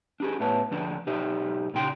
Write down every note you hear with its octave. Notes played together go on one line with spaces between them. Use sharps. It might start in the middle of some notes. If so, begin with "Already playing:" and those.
D4 G4 G#4
A2 A3 B3 B4 C#5 A5
D2 F3 D4
B1 D#4 G4 C5 E5
A#2 C#3 D#4 F4 G5 C6